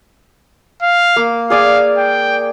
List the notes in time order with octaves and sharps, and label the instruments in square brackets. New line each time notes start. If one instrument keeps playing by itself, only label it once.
[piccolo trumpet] F5
[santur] A#3
[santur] G#4 D5 G#5 [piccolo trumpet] F5
[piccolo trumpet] G5